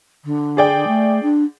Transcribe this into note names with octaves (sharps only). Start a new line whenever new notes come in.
D3
G#4 D5 G5
A3
D4